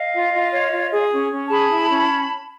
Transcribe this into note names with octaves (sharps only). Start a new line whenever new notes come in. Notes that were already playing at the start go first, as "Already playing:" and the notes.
Already playing: D#5 F5
F4
F4
C#5
F4
G#4
C#4
C#4
G#4 A5 B5
E4
C#4